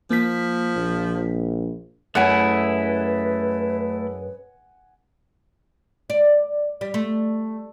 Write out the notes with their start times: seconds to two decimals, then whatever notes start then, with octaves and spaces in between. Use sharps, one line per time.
0.11 F3 A#3 B6
0.76 A#1
2.15 F#2 G#3 A3 E4 B4 F#5 G#5
6.10 D5
6.81 G3
6.94 A3